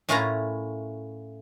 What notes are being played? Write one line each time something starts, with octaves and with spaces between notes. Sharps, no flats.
A2 C#4 E4 F4 A#4 A#5